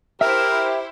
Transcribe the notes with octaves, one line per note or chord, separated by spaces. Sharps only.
E4 G4 A#4 C5 E5